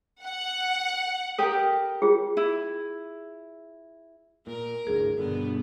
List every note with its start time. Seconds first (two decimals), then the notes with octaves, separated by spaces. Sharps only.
0.23 F#5
1.39 G4 A4 A#4
2.02 F4 G#4
2.37 E4
4.47 A#2 A#4
4.87 G#1 D2 A2 G#4
5.18 G1 G2 B2 D3 B3